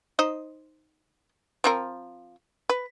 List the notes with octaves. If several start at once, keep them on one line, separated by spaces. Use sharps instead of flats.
D#4 C5 D#5
F3 C4 A#4
B4